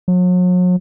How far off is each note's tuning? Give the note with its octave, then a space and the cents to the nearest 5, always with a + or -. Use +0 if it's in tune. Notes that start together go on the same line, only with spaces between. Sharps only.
F#3 -40